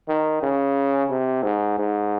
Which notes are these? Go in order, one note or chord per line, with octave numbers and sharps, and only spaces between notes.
D#3
C#3
C3
G#2
G#2